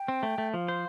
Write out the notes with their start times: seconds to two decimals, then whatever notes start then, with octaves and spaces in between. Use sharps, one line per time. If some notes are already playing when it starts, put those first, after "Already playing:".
Already playing: G5
0.08 C4
0.23 A3
0.38 A3
0.53 F3 F5
0.68 C5